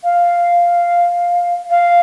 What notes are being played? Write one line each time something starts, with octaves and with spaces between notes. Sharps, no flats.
F5
F5